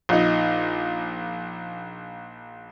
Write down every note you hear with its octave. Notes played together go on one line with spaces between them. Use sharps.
A#1 D#4